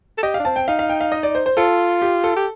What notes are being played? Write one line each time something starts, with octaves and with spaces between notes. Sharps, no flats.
A4
G4 D#5
F5
D4
C4 A5
G5
D#4 F5
F5
G5
F5
D#5
D5
C5
C5
F4 A4
G4
A4
G4